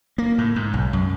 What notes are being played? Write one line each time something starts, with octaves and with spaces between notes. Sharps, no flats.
A#3
A2
G#2
B1
F#2